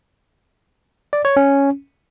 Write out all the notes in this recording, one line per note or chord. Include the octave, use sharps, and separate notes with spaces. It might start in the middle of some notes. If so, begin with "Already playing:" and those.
D5
C#5
C#4